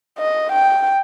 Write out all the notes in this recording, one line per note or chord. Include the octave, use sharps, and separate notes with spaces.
D#5
G5